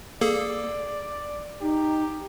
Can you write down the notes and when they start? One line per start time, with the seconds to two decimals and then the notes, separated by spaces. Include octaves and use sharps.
0.21 A#3 G#4 A4 D5
1.62 D#4 G4